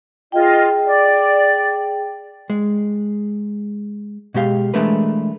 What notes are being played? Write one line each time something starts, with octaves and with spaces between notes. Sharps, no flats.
F4 G#4 D#5 G5
D5
G#3
B2 G#3 G4 F5
E3 G#3 A3 D4 A#4 B4